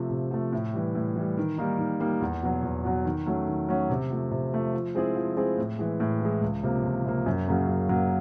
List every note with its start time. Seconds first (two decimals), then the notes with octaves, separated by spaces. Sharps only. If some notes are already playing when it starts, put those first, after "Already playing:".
Already playing: C3 F3 A3
0.11 C3
0.31 F3 A3
0.52 A2
0.74 E3 G3
0.95 A2
1.16 E3 G3
1.37 D#3
1.58 G3 A#3 D#4
1.79 D#3
2.00 G3 A#3 D#4
2.21 E2
2.42 B2 F#3
2.63 E2
2.84 B2 F#3
3.05 D#3
3.26 F#3 A3 C#4
3.47 D#3
3.69 F#3 A3 C#4
3.90 C3
4.11 F3 A3
4.31 C3
4.52 F3 A3
4.74 F3
4.95 G#3 C4 E4 G#4
5.16 F3
5.37 G#3 C4 E4 G#4
5.57 A2
5.79 E3 G#3
6.00 A2
6.21 E3 G#3
6.41 C#2
6.63 C3 F3 A#3
6.84 C#2
7.05 C3 F3 A#3
7.26 F#2
7.47 C#3 F#3 A#3
7.68 F#2
7.89 C#3 F#3 A#3